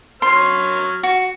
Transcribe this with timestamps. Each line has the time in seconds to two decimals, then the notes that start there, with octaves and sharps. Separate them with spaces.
0.22 F#3 C#5 C6 F6
1.03 F#4